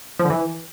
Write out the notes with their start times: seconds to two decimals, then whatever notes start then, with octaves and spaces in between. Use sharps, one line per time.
0.19 F3
0.25 D3
0.30 E3